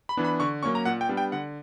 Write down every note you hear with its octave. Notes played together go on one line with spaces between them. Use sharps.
B5
E3 B3 D4
B5
D3 C#6
F#3 A#3 C#4 C#6
A#5
A#2 F#5
G5
G3 B3 D4
G5
D3 F#5